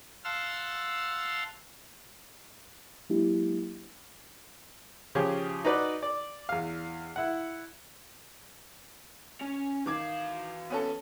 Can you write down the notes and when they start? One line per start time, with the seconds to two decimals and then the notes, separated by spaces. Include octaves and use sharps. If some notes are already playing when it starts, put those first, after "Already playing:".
0.24 F5 F#5 A5 C6 E6 F6
3.10 F#3 G#3 A#3 D4 E4 G4
5.15 C#3 F3 G4 G#4 C#5
5.65 D#4 F#4 B4 D5
6.03 D5
6.49 E2 F5
7.16 E4 F#5
9.41 C#4
9.86 D#3 E3 F5 D6 G#6
10.70 B3 C#4 A4